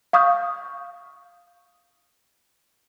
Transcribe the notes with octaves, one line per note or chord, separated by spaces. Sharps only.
F5 C#6 D#6 F6 G6